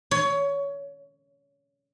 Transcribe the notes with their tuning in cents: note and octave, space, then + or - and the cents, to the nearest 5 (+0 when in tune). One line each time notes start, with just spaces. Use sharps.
C#5 +20